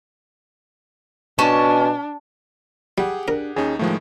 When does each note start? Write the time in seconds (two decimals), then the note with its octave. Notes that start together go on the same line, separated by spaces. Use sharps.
1.39 B2 C#4 D4 A5
2.98 G3 G4 G#4 F#5
3.28 D4 A#4
3.56 D#2 C#4 D#4 G#4
3.79 A2 D#3 F3 G#3 A3